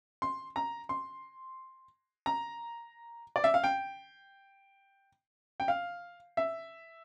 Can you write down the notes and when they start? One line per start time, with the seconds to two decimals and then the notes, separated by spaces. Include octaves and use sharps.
0.22 C6
0.56 A#5
0.89 C6
2.26 A#5
3.36 D5
3.44 E5
3.54 F5
3.64 G5
5.60 G5
5.68 F5
6.37 E5